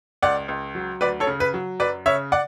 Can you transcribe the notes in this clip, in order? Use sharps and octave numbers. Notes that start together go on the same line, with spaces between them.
C#2 D5 F#5
C#2
F#3
D2 B4 D5
A4 C#5
C#3
B4
F#3
F#2 B4 D5
C#3 C#5 E5
D5 F#5